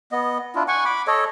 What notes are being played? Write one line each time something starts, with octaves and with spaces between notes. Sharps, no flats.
B3 D#5
D4 E4 F4
F#5 G#5 C#6
B5 D6
A4 C#5 D#5